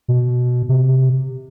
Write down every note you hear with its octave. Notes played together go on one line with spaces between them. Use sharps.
B2
C3